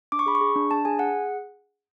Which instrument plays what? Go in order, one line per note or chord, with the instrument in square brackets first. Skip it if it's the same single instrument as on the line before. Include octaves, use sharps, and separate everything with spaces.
[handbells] D4 D6
C#6
G#4 B5
C#6
G#4
D4
D4 A5
G#4 G#5
G#4 F#5